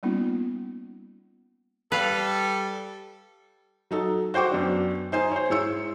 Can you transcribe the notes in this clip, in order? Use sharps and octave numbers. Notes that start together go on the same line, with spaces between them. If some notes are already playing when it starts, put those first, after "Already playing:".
G3 A#3 B3 C#4 D#4 F4
G3 A4 B4 F5
F#3 D#4 A4
F#4 C5 G5 C#6 D6
F#2 B3 D4
D#4 C5 G#5
C5 C#5
G#2 E4 C#5 E6 C#7